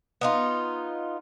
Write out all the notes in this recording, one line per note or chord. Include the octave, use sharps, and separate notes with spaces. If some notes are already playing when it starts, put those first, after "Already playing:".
B3 D#4 F4